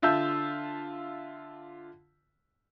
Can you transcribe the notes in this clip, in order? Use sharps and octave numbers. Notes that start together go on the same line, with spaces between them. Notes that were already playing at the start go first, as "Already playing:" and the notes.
D3 F4 E5 A5 E6 G6